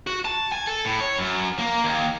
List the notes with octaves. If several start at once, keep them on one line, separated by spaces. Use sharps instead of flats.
F#4
A5
G#5
A4
A2
C#5
F#2
A#3
D#2